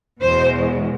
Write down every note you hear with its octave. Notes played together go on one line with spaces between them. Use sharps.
E2 B2 G#3 C5